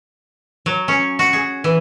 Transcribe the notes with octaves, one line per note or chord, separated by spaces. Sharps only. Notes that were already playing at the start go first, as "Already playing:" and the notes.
F#3
C#4
F#4
G#4
E3